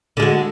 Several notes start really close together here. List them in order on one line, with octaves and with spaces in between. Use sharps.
D3 G#3 F#4